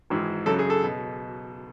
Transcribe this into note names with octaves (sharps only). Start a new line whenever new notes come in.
G#1 G#2 E3
F#2 C#3 F#3 A4
G#4
A4
B2